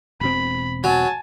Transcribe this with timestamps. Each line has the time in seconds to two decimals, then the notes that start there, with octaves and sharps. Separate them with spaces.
0.21 E1 B2 C4 B5
0.84 F#3 G#5 A5